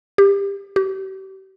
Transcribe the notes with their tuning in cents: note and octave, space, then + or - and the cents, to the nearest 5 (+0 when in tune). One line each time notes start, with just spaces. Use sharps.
G4 +20
G4 -40